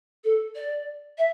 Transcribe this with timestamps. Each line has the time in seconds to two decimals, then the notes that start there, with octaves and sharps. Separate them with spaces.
0.24 A4
0.55 D5
1.18 E5